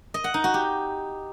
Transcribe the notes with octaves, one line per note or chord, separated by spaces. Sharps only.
D#5
F#5
D#4
F#4
G4